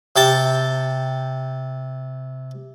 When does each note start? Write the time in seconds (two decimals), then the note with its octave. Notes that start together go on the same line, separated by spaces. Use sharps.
0.16 C3 G5 A5